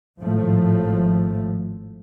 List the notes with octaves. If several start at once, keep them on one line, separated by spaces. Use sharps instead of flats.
G#1 A2 F3 A3